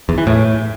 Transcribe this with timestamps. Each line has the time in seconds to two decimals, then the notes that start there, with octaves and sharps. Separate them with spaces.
0.09 E2
0.18 E3
0.27 A2